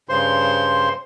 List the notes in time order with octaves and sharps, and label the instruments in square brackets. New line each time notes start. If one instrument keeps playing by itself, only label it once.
[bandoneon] G2 C#3 C5 C6